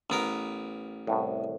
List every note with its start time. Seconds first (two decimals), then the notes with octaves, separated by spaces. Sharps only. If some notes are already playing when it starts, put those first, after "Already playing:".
0.10 A1 B3 A#4
1.07 C2 A2